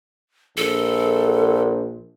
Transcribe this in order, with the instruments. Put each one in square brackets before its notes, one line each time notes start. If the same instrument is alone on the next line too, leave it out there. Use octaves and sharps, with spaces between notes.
[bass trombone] A#1 [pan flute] A4